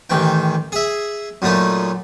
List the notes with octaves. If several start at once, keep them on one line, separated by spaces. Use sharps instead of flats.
A1 D#3 E3 G5
G#4 E5
F#2 A#2 A3 D#4